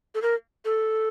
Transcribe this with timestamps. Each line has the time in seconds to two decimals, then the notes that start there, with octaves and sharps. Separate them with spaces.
0.15 A4
0.22 A#4
0.65 A4